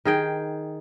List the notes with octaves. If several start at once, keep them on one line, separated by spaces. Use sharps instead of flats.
D#3 G#4 G5